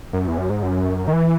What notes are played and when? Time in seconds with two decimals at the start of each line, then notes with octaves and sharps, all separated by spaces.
0.13 F#2
0.28 E2
0.38 F#2
0.50 G#2
0.62 F#2
1.08 D#3
1.13 E3